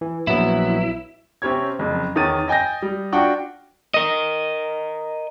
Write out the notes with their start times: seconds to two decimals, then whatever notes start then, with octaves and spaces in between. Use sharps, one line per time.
0.01 E3
0.27 A#1 F#3 B3 E4
1.42 C3 C4 C#4 G4 C#5 G#6
1.79 F#1 F2
2.16 E2 D#3 C#5 D#6 A6 D#7
2.48 D#5 G5 G#5 G6 A#6
2.82 G3
3.12 D4 F4 F#4 F#5 G5 C#6
3.94 A#4 D#5